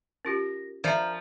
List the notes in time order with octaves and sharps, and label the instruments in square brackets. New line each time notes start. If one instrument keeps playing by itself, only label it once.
[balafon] C#4 F4 G4 [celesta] A#4 A#6
[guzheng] F3 [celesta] A#4 A#5 F6 [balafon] D5 E5